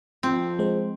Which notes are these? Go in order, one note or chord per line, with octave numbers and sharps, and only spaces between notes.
F2 C4
G#3 C5